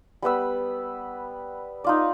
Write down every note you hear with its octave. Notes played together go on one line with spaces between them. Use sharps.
G3 B3 B4 E6
D#4 F4 D5